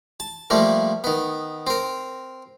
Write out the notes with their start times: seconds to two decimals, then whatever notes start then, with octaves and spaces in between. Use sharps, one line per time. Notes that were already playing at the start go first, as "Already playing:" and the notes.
0.20 A5
0.50 F3 G3 A3 A#3
1.04 D#3 B3
1.67 C4 A#4